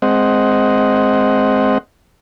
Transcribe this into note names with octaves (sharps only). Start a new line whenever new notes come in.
G#3 C4 C5 D#5 F#5